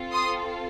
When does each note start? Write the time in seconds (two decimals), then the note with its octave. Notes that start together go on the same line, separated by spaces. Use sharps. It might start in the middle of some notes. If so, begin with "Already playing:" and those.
Already playing: C4 F4 A4
0.12 C6 D#6